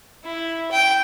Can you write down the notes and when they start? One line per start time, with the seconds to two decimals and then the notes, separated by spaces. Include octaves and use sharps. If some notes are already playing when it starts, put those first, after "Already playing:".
0.24 E4
0.71 G5